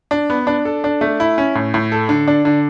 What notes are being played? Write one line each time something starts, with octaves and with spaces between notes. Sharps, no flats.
D4
B3
D4
A4
D4
A3
E4
C#4
A2
A2
A4
D3
D4
D3